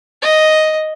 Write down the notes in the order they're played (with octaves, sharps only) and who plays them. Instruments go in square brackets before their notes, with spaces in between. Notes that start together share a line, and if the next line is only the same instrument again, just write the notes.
[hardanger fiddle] D#5